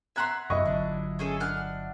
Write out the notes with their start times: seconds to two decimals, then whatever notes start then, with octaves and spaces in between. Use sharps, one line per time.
0.16 E5 F#5 A#5 C6 F#6 G#6
0.50 B1 F#2 C3 E4 D#5 C#6
0.65 G1 D3 F#3 D4
1.19 C#4 G#4 A4
1.40 D4 F#5 F6